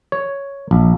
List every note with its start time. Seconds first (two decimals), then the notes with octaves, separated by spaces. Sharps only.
0.12 C#5
0.71 A#1